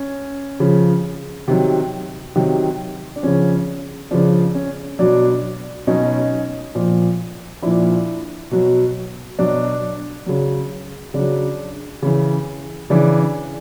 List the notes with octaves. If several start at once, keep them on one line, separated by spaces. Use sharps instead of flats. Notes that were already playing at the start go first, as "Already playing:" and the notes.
Already playing: C#4
C#3 F3
C3 D#3 F#3
C3 D#3 F#3
D4
C#3 F3 C#4
C#3 F3 D4
C#4
B2 F#3 D4
B2 F#3 C#4 D#4
A#2 F3
A#2 F3 D4 E4
B2 F#3
B2 F#3 D4
C#3 F#3
C#3 F#3 D4
C#3 E3
C#3 E3 D4